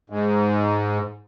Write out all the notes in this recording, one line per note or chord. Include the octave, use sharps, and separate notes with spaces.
G#2